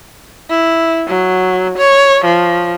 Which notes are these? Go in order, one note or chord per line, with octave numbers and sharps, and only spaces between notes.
E4
F#3
C#5
F3